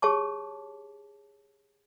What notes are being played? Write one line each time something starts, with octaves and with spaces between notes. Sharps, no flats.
G4 G#4 C#5 A5 D6